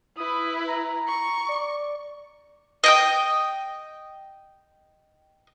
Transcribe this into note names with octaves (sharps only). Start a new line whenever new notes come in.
E4 B4 D#6
A#5
C#6
D5
D#5 G5 D#6